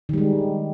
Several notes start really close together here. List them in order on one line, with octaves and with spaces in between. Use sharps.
D#3 G3 G#3